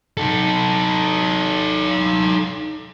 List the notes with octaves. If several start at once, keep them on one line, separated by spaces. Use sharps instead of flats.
D#4 A4